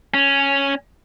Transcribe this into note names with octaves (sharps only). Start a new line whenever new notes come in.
C#4